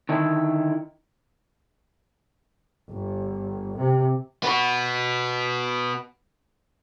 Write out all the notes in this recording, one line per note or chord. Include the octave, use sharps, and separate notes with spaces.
D3 D#3 E4
G1
C3
B3 F#4